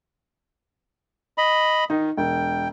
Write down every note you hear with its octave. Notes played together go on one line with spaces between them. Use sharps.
D#5 B5
D#3 D#4
E1 G5